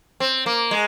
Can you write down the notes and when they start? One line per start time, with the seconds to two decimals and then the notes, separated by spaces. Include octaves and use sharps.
0.20 C4
0.46 A#3
0.71 G#3